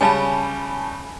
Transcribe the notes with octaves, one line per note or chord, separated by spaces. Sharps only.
C#3 G3 C#4 G#5 A5 B5